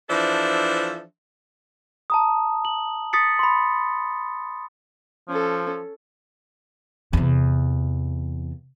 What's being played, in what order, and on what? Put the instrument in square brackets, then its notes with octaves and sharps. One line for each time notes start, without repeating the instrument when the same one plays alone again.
[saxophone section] E3 F3 D4 A4 C5 E5
[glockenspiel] A5 A#5 D#6
F#7
D#6 A6 B6 C#7
B5 C6
[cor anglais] F3 [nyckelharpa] C#4 A4
[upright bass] E2 C3